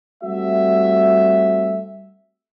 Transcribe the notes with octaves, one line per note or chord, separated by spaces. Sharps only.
G3 A3 C4 F#4 E5